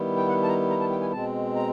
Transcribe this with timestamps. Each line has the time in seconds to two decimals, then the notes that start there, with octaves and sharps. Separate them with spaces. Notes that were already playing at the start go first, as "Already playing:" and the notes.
Already playing: D#3 G3 B3 E4
0.17 G5
0.27 F#5
0.43 A5
0.48 A#5
0.70 A#5
0.80 A5
0.91 G5
1.01 G#5
1.12 B2 G#3 C4 A5
1.56 A#5